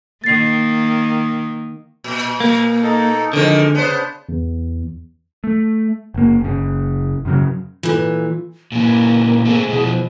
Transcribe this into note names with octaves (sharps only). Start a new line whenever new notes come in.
D#3 A#3 A6 C7
A#2
A#3
D#4 A4
F2 D3 D#3 F3 G#3
C#3 B3 D4 C5
E2
A3
F#1 A#3
F#1 C#3
F#2 C#3 F#3
A#2 E3 F4 A4
A#2 E3 A#3
A3 C4 G#4
B2 D#3 E3 G#4
F3